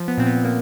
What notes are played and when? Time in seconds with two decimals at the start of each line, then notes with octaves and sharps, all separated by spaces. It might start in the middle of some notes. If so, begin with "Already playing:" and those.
Already playing: F3
0.08 B3
0.18 A#2 C4
0.26 B3
0.44 A#2 A#3